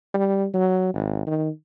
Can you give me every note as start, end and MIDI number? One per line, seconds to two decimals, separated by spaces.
0.14 0.46 55
0.54 0.90 54
0.94 1.24 32
1.27 1.49 51